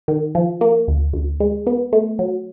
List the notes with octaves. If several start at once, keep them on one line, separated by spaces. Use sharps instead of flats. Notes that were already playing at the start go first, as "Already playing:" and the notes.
D#3
F3
A#3
D2
D2
G#3
B3
A3
F#3